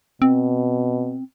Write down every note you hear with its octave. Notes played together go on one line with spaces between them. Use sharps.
B2 C4